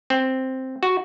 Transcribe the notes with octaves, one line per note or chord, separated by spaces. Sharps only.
C4
F#4